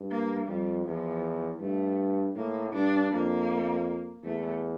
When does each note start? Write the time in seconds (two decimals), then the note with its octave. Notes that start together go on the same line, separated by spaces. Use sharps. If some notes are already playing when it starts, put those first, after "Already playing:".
Already playing: G2
0.11 A#3
0.48 F2 G3
0.86 E2 F3
1.61 G2 A3
2.35 A2 A#3
2.73 G2 D4
3.11 F2 A#3
4.24 E2 A3